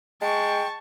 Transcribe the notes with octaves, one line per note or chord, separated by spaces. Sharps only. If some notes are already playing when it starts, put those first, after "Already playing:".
G#3 G5 A5 C#6